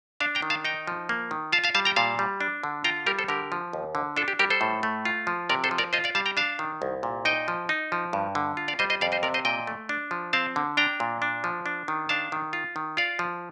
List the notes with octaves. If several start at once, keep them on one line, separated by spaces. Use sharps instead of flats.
D4 F5 A5
G5 A#5
D#3
F5 A5
D#4 G5 A#5
F3
A#3
D#3
F4 F5 A5
F5 A5
G3 F5 A5
G5 A#5
A#2 F5 A5
G3
D4
D3
F4 G5 A#5
G3 G4 A#4
A4 C5
D3 G4 A#4
F3
D#2
D3
D4 F4 A4
G4
G3 G4 A#4
A4 C5
A2
A3
F4
F3
C3 A#4 D5
A4 C5
F3
A#4 D5
F4 C5 D#5
D5 F5
G3 F5 A5
G5 A#5
D4 F5 A5
D#3
C2
A#2
D#4 D#5 G5
F3
D#4
F3
G2
D3
F4
D5 F5
G3 C5 D#5
C5 D#5
F2 D5 F5
C5 D#5
C3 A#4 D5
C5 D#5
A#2 D#5 G5
A3
D4
F3
C4 F5 A5
D3
D4 G5 A#5
A#2
D4
F3
D4
D#3
D4 F5 A5
D#3
F4
D#3
F4 D5 F5
F3